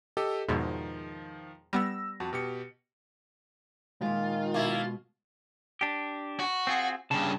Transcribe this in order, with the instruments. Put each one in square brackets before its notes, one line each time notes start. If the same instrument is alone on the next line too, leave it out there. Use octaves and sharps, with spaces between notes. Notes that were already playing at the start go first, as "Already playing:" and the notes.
[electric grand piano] G4 A4 D#5
[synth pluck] E2 G#2 B2 [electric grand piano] D#3 F3
[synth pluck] G3 B3 [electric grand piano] E6 A#6
[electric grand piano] F2 F#4 A5
B2 G4 C#7
[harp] A#2 G#3 [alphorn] D#3 [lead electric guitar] F4
[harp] B2 [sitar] A#3 E4
[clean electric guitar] D4 G4
[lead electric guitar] F#4
[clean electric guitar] C4 F4 G#4
[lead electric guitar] G2 C#3 [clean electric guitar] A5